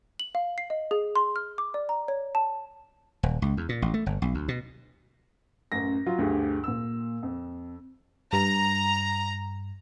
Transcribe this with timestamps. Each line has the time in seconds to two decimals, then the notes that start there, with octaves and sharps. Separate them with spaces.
0.20 F#7
0.35 F5
0.58 C7
0.70 D#5
0.91 G#4
1.16 C6
1.36 F6
1.58 D6
1.74 D5
1.89 A#5
2.08 C#5
2.35 A5
3.23 D#1
3.42 C#2
3.57 E2
3.69 A#2
3.82 A1
3.94 A3
4.06 G1
4.22 B1
4.35 D2
4.48 B2
5.72 A1 F#2 A#6
6.06 F#3 F4
6.19 D2 G2 G4 G#4
6.64 A#2 E6
7.23 F2
8.33 G2 A#5